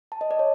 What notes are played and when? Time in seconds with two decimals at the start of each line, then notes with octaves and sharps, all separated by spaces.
0.12 A5
0.21 D#5
0.31 D5
0.39 C#5